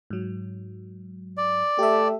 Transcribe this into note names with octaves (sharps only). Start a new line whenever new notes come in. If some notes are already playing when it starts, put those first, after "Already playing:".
G#2 F#3
D5
A3 G4 E5